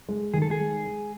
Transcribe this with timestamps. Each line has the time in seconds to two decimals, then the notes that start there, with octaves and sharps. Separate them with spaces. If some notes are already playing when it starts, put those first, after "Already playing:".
0.09 G#3
0.34 D#3 G#4
0.42 A4
0.51 G#4
0.59 G#3
0.85 G#3